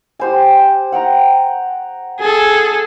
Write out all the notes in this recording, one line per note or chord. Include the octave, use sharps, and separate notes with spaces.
G4 C5 G#5
F#5 G5 A#5
G#4 A4